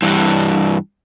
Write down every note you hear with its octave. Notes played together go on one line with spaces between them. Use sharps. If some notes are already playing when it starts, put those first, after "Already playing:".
G2 E3